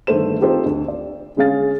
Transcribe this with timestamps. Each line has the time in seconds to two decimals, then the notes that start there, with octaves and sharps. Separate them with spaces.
0.07 G1 D#3 A3 A4 C5 E7
0.41 C4 D#4 F4 G4 A4 C5
0.66 D2
0.88 D5
1.36 D3 G#3 C#4 G#4 F5 A6